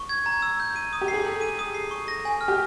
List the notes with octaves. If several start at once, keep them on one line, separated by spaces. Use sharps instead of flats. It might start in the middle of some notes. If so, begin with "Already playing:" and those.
Already playing: C#6
G#6
A#5
E6
G6
D#7
D#6
G4
C7
G#4
A4 G6
D#7
D#6
C7
C#6
A#6
G#5
F6
G4